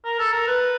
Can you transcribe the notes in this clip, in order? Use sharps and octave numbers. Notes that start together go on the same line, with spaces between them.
A#4
A4
A#4
B4